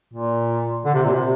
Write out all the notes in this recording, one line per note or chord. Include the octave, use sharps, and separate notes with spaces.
A#2
D3
C3
A#2
C3